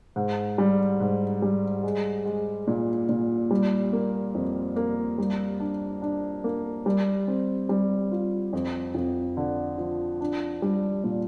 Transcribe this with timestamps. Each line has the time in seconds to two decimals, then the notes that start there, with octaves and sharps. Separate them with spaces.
0.16 G#2
0.58 G3
1.00 G#2
1.42 G3
1.84 G#3
2.26 G#3
2.67 A#2
3.09 A#2
3.51 G3
3.93 A#3
4.35 F2
4.76 A#3
5.18 G3
5.60 D4
6.02 D4
6.44 A#3
6.86 G3
7.27 C4
7.69 G3
8.12 F4
8.53 F2
8.94 F2
9.37 D3
9.78 F3
10.21 D4
10.62 G3
11.04 A#2